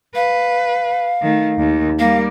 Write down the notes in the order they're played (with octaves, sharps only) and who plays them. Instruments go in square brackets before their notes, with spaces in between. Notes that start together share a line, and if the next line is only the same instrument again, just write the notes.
[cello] B4 [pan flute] F5
[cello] D#3 A3
D#2
[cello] G3 A#3 [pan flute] F5